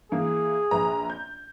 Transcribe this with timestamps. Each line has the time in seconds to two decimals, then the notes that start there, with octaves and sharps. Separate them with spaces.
0.12 E3 A#3 G#4
0.71 A#1 B4 A#5
1.10 G6